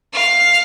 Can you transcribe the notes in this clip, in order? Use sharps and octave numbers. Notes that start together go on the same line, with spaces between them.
F5